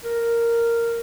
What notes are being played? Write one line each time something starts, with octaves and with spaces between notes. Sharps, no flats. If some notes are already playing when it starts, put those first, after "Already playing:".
A#4